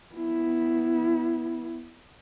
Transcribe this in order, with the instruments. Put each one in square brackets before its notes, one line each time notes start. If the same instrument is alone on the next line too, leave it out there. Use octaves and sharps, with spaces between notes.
[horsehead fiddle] B3 E4